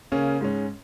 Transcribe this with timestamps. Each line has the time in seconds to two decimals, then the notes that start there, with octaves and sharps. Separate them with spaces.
0.12 C#3 A#3 C#4
0.41 G#2 G#3 C#4